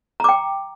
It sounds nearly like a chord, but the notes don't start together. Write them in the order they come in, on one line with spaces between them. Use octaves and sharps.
A#5 D6 G5